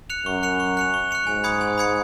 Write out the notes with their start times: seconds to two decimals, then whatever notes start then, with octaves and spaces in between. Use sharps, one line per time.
0.10 F#6 C#7 F7
0.26 F#2 C#6
0.43 F#6 C#7 F7
0.60 C#6
0.77 F#6 C#7 F7
0.94 C#6
1.11 F#6 C#7 F7
1.27 G#2 G#5
1.44 B5 D#6 G#6 C#7
1.61 G#5
1.78 B5 D#6 G#6 C#7